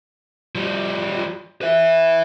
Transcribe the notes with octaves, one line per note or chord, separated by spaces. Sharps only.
F3 G3
B4 E5